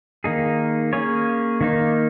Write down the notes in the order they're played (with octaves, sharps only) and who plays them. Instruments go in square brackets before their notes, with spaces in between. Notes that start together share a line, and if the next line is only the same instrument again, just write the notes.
[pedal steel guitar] D#3 A#3 D#4 G#4
A#3 C#4 G#4 C#5
D#3 A#3 D#4